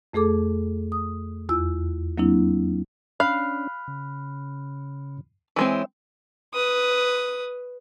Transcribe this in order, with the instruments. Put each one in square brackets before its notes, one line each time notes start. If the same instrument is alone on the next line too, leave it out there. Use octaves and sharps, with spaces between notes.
[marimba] F2 A3 G#4 A4 D6
D#6
E2 F4 E6
F#3 A#3 C4 D4 E4
[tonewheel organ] C#4 D4 [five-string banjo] F5 [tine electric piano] B5 F6 F#6
[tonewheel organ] C#3
[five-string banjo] E3 G#3 C4 [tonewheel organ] C#5 E5 E6
[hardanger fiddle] B4 D#6